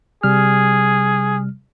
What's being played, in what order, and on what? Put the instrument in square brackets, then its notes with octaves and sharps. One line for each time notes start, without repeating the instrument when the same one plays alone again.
[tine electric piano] C3 G3 F6 [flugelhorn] G#4